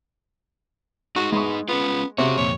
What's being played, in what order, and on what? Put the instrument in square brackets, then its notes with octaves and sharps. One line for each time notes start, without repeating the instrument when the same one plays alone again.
[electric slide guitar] D#4 G#4 [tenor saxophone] F#4
[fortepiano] G#3 C#6 [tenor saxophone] B3
[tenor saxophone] B3 [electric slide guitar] C#4 F4
[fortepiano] C3 [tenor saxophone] F#4 [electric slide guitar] G#4 C#5
[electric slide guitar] F2 A#2 [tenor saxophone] C#5